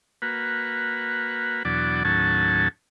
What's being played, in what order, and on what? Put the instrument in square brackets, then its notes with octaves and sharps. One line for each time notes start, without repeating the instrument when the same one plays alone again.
[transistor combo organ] A#3 F#4 B4
E2 B2 F#3 D4 D5
D#2 A2 F#3 C#4 A5